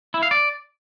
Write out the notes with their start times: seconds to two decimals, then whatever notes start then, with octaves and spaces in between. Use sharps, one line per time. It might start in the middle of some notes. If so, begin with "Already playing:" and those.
0.14 E4
0.23 F5
0.31 D5